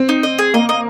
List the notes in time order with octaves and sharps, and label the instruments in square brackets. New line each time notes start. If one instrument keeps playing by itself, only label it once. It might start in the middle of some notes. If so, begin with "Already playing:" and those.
Already playing: [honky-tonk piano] C4
[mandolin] D#4
D#5
G#4
[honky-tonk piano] A#3 [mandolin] D#5
[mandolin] D#5